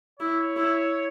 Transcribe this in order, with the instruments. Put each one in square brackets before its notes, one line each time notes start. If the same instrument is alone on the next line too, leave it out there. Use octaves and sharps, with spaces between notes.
[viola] E4 [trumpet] C#5
[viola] E4